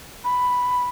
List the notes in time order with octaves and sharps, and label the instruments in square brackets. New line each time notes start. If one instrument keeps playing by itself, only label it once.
[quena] B5